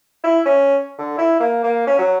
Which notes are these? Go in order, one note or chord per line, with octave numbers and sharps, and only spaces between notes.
E4
C#4
D3
E4
A#3
A#3
C#4
F#3